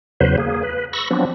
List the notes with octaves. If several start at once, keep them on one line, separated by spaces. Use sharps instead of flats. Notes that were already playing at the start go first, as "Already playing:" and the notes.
E2 C#3 F#3 B4 C5
A#3 G#4
B4
B5 C#6 E6 A#6
F3 F#3 B3 C4 D4